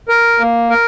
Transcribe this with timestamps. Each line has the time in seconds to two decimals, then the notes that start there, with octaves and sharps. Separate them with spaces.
0.09 A#4
0.40 A#3
0.70 A#4